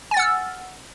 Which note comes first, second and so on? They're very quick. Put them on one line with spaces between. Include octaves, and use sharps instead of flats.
G#5 A6 F#5 E6 F6